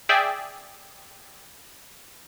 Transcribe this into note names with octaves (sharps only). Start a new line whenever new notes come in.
G#4 D5 E5 G5